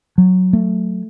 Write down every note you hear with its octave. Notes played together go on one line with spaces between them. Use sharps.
F#3
A3